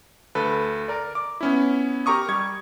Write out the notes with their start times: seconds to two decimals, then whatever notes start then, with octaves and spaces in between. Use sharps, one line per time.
0.35 D2 A4 B4
0.88 A#4 D5
1.15 D6
1.41 B3 C#4 E4
2.06 G4 A#4 A#5 C#6 D#6
2.28 G3 C#6 G#6